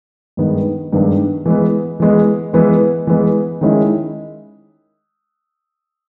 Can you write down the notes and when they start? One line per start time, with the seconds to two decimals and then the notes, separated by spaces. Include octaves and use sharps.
0.37 G2 D#3 G#3 B3 D4
0.93 G2 D#3 G#3 B3 D4
1.46 E3 G#3 B3
2.00 E3 G#3 B3
2.53 E3 G#3 B3
3.07 E3 G#3 B3
3.61 D#3 G#3 C#4 E4